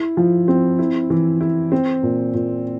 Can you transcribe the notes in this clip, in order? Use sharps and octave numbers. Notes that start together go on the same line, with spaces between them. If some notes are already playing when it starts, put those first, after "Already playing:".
Already playing: E4
F3
C4
E4
E3
E4
C4
A#2
A#2